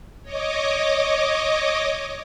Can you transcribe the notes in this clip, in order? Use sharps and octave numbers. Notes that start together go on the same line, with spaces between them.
C#5 D#5 D6